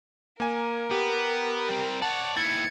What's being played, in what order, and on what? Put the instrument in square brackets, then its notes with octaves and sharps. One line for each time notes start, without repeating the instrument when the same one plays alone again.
[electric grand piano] A#3 G#5 [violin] A#4
[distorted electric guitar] B3 [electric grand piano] G4
[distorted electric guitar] G3 C4
[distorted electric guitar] C#5 D5 [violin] F#5 [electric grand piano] A5
[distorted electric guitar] D#2 E4 [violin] G#6 C#7 [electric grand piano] A6